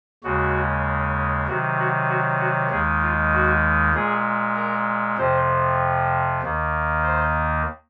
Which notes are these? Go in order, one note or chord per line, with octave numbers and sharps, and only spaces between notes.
D#2 C#3 G#3 F#4
C3 D#3 F#3 F#4
F#4
F#4
F#4
D#2 D#3 G#3 G#4
F4
F#4
A#2 G#3 G#4
A#4
F2 C3 F3 C5
D#2 D#3 A#3
C5